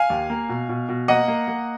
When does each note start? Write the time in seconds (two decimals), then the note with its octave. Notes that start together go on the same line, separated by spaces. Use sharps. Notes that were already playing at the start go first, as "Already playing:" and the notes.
Already playing: F5 G#5
0.10 D#2
0.30 A#3
0.49 B2
0.69 B2
0.89 B2
1.08 A#3 D#5 F#5
1.28 A#3
1.48 A#3